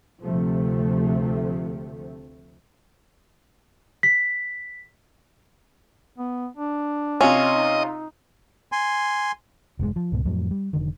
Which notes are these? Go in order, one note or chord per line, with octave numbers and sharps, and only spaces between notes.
D2 C3 F3 A3
B6
B3
D4
C3 C#4 F4 D#5
D#4
G#5 C6
F1 G#2 C3 G#3
F3
C#2 G#2 B2
F2 A2 F#3
G3
F1 D3 D#3